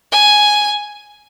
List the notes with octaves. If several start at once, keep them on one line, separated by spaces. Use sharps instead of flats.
G#5